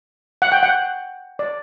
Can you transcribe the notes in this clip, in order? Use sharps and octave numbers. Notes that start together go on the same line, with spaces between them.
F#5
G5
F#5
D5